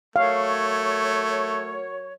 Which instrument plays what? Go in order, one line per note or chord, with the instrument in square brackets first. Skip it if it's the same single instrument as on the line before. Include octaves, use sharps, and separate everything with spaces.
[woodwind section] F#3 A#4 C#5 [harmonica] A3 [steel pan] F5